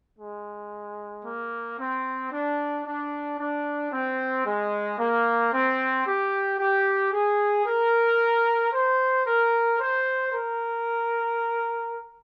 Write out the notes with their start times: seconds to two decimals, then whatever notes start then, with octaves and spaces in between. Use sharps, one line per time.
0.19 G#3
1.25 A#3
1.79 C4
2.32 D4
2.85 D4
3.39 D4
3.92 C4
4.46 G#3
4.99 A#3
5.53 C4
6.06 G4
6.59 G4
7.13 G#4
7.66 A#4
8.73 C5
9.26 A#4
9.80 C5
10.33 A#4